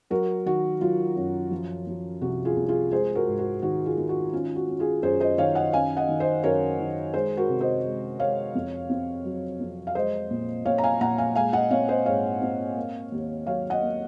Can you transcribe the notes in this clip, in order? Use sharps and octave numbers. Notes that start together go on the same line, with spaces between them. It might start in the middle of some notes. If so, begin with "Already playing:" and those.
F#3 F#4 A#4
D#3 F#4
F#3 F4
F#2
F3
F3
C2 F#4
F4 G#4
C2
F4 G#4
G#3 G#4 C5
F#4 A#4
G#2
F#4
D#3 F#4
F4 G#4
D#3
F#4
C#4 F4
F#4
C#4
F4 G#4
F#2 G#4 C5
C5 D#5
D#3 C#5 F5
D#5 F#5
C#4 F5 G#5
D#5 F#5
D#3
C5 D#5
F#2 A#4 C#5
D#3
G#3 G#4 C5
F#4 A#4
C3
C5 D#5
G#3
G#3 C#5 F5
F2
C4
F#3
F2
F5
G#3 C5 D#5
A#2
A#2 C#5 F5
A#5
F5 G#5
A#2 F#5 A#5
F5 G#5
G#3 F5 G#5
D#5 F#5
C4 C#5 F5
C5 D#5
G#2 C#5 F5
C4
A#3
D#2
F#3 C#5 F5
D#5 F#5
A#3